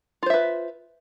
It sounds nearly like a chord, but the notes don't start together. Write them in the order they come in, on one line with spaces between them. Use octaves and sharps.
F4 C5 E5 B4